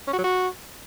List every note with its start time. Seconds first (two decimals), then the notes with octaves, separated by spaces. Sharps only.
0.07 C#4
0.13 F#4
0.18 F#3
0.24 F#4